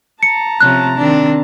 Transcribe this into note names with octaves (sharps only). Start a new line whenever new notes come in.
A5 A#5 C#7
C3 F3 C#4 F#6
D#3 C4 D4